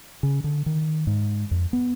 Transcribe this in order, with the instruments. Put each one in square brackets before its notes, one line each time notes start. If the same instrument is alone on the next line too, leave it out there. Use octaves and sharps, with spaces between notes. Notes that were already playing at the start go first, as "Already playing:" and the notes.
[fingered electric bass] C#3
D3
D#3
G#2
F2
B3